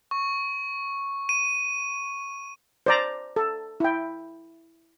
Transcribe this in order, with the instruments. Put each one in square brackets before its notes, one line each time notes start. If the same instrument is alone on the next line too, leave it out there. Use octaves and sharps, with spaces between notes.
[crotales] C#6
D#7
[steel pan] C5 D5 A#5
A4
E4 G5